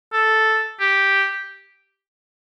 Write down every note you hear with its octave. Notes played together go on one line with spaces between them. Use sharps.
A4
G4